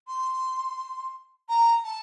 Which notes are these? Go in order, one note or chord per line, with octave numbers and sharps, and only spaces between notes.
C6
A#5
A5